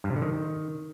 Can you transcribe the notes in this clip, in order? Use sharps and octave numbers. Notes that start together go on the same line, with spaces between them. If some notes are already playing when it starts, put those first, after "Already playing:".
G2
C3
D3
D#3